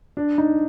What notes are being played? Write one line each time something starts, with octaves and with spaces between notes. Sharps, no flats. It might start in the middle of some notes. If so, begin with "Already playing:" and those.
D4
D#4